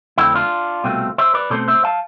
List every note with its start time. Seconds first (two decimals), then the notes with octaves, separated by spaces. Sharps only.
0.18 F2 D3 A3 C4 E4
0.35 D4 F4
0.84 C2 B2 A3 C4
1.18 C5 E5
1.34 B4 D5
1.50 B2 A3 C4 A4 C5
1.68 C5 E5
1.84 F5 A5